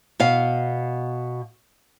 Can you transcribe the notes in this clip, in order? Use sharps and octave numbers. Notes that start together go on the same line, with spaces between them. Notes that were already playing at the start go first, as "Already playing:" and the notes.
B2 F5